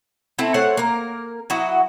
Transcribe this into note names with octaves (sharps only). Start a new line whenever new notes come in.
A3 C4 E4
A3 C5 C#5 F#5
A#3 A#4
F#3 E4 F#4 D#5